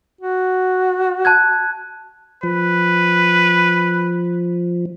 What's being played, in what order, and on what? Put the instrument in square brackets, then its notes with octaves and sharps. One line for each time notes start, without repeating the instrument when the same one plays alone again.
[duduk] F#4
[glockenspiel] A5 F#6 G#6
[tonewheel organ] F3 [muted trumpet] B4